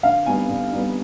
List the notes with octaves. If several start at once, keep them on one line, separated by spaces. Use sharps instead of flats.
D3 F5
G3 B3 D#4 G#5
D3
G3 B3 D#4